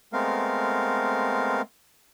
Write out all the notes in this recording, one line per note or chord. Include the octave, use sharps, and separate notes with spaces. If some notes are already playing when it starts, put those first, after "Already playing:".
G#3 A3 B3 C4 A#4 F5